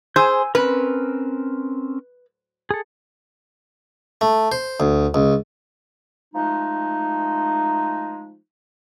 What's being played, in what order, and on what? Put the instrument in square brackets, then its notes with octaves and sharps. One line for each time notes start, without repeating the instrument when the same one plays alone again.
[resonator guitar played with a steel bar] G#4 C5 [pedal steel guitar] G#5 E6 G6
[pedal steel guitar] C4 C#4 A#4 [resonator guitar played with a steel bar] B4
[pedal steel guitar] G#4 A4
[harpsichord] A3
C5
D2
C#2
[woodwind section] F3 G#3 A3 D#4